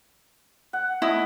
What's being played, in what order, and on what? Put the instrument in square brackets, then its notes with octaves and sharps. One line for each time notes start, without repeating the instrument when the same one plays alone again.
[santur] F#5
[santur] A3 D#5 D#6 [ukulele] E4